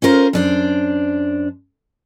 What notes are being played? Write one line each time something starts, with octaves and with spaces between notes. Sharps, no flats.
C#4 F4 A#4 C5
F#2 D4 C5